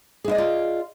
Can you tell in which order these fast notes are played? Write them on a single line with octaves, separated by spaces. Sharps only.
G#4 E4 D#5 D5 F4